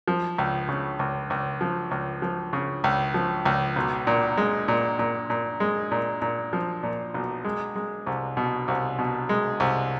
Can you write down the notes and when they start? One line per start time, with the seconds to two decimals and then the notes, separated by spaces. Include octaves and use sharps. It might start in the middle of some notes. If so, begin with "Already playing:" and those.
0.08 F3
0.38 C#2
0.69 C#3
0.99 C#2
1.30 C#2
1.61 F3
1.91 C#2
2.22 F3
2.53 C#3
2.84 C#2
3.14 F3
3.45 C#2
3.76 B1
4.07 A#2
4.37 G#3
4.68 A#2
4.99 A#2
5.30 A#2
5.60 G#3
5.91 A#2
6.22 A#2
6.53 F3
6.83 A#2
7.14 B1
7.44 G#3
7.76 G#3
8.07 C2
8.37 B2
8.68 C2
8.99 B2
9.29 G#3
9.60 C2